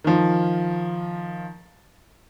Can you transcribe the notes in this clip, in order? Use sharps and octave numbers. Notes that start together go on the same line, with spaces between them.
D#3 F3